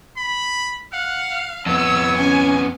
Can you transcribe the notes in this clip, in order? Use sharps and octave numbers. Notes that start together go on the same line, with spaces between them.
B5
F5 F#5
F2 B3 C#5 E6
C#4 G#5